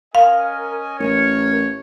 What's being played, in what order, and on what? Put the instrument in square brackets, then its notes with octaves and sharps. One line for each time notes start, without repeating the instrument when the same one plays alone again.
[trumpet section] C#4 D#5 G#5 [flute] A#4 [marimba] F5
[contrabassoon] A1 [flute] A#4 [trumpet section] C#5